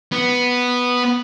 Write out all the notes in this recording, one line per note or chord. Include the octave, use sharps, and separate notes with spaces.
B3